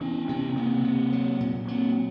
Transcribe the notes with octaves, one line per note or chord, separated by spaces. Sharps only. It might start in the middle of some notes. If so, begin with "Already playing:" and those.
E3 B3 C#4
C3 B3 C#4
C3 A#3 C4
C3
F#3
A#2
F#3 A#3 C4